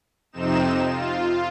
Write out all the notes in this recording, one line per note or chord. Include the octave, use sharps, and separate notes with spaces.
F2 C3 C4 D#4 E7
F4